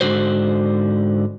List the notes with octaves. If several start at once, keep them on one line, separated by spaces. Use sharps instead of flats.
G#2 D3 D#3 F#4 C5